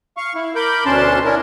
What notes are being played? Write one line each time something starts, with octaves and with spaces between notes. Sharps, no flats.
F5 C#6
E4
A#4 B5 D6 G6
D2 B2 C#4 D4 A5 C6
C#4 D4 E4 A#4